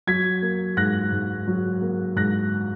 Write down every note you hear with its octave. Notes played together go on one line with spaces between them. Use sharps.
F#3 G#6 B6
A#3
G#2 F#6 A#6
G#2
F#3
A#3
G#2 F#6 A#6